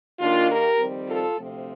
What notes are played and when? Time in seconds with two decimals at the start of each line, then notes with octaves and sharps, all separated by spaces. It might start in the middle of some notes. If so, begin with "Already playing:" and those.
0.20 D#2 D#3 A#3 D4 F4
0.49 G4 A#4
0.78 F2 D#3 G3 C4
1.08 F4 A4
1.38 D2 C3 F3 A3 C4